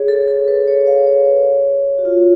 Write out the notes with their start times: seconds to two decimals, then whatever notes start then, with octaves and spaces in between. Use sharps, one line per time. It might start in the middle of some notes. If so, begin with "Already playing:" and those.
Already playing: G#4 C#5
0.08 A4
0.28 A4
0.48 B4
0.67 C#5
0.87 F5
1.07 C#5
1.98 F#4
2.05 F4